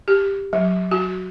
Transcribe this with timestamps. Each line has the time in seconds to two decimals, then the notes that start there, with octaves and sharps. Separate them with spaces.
0.08 G4
0.53 F#3
0.91 F#4